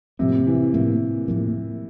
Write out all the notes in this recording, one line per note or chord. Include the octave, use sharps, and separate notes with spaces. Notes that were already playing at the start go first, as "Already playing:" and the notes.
A2 C3 F3 A#3
E3
A2 F3 A#3
A2 F3 A#3